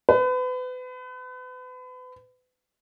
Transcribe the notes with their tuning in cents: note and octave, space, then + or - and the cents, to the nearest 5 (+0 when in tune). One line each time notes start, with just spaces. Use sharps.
B4 +35